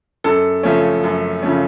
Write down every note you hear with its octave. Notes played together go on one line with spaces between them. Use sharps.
F#2 A4
C#3 F3 A3 C#4
F#2
C#3 F3 A3 C#4